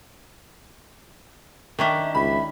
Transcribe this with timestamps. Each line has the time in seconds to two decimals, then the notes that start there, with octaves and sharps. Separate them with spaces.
1.79 D#3 C#4 D4 E5
2.15 C#2 E5 B5